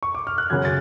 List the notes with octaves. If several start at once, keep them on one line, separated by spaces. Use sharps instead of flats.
C#6
D6
F6
F#6
F#2 C#3 F#3 G#6
A6